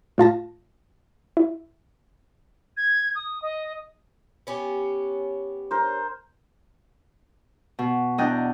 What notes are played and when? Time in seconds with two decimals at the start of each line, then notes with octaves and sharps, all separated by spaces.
0.18 A2 F4 A5 A#6
1.37 E4
2.77 G#6
3.15 D#6
3.42 D#5
4.47 B3 C#4 G4
5.71 A#4 C5
7.79 B2
8.18 E2 D4 D#5 G5 F#6